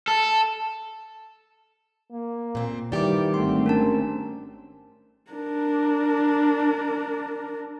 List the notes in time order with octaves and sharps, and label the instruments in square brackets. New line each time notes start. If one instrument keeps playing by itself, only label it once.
[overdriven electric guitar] A4
[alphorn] A#3
[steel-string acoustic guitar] A#2 C4
[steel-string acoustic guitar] D#3 G4 [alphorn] E3 [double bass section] G3 [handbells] D5 D6
[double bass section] G#1 A3 C4 [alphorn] D3 [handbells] C6
[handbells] C#4 D4 A5 [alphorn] A#4
[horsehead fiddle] D4 A#4